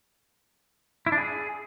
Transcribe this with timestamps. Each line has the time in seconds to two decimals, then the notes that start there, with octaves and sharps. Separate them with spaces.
1.06 E4
1.12 D4
1.18 G#4